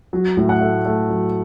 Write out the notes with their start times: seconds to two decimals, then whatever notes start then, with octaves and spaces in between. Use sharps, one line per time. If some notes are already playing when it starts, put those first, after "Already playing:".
0.13 F#3
0.37 A2
0.49 F#5
0.61 A3
0.85 A3
1.10 F#3